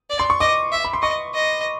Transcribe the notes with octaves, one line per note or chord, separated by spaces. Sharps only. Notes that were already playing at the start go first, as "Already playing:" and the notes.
D5
C6
C#6
D#5 D6
E5
B5
C6
D#5 C#6
D#5